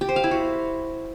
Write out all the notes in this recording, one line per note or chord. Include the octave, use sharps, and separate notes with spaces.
G4
C5
F5
E4
F#4